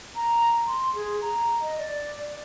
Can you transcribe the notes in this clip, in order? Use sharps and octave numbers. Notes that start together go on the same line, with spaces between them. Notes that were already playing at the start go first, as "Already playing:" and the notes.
A#5
C6
G#4
A#5
D#5
D5